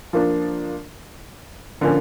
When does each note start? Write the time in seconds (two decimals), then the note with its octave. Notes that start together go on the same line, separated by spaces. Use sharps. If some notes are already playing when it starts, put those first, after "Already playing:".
0.13 F3 A#3 D4
1.81 D3 F3 A#3 C#4